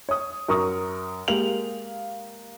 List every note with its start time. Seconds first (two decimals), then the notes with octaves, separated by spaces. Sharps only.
0.09 C#5 D#6
0.48 F#2 A#4 C#6 D#6
1.28 G#3 A#3 G4 F5 F7 F#7